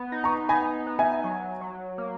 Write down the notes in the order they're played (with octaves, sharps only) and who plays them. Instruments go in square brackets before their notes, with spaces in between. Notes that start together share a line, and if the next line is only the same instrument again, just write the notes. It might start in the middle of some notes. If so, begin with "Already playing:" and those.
Already playing: [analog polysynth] B3
D#4
[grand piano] A#5 C#6
[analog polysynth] D#4 [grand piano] G#5 B5
[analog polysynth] B3
[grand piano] E5 G#5
[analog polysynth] F#3
F#3
A#3